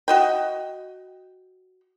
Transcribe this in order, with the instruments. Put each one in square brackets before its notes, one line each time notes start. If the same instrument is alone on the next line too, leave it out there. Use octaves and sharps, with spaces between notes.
[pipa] F#4 D#5 G5